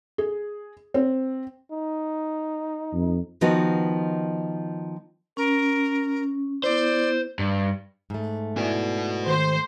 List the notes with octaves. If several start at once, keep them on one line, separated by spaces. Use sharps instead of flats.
G#4
C4
D#4
F2
D#3 F3 B3 D#4 F#4
C#4 A#4
B3 E4 C5 D5
G2
G#2 A3
E4 F#4 B4 D5 G#5
D#3 G4 C5